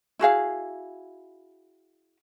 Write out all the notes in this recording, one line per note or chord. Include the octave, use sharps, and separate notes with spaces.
E4 F#4 G#4 F5